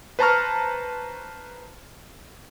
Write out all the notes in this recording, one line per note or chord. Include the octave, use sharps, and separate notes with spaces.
B4 C5 A5 A#5 C#6 F6